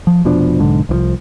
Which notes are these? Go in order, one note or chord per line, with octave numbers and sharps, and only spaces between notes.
F3
F1 B2 F3 D4
B1 G#2 D3
C2 E3 F3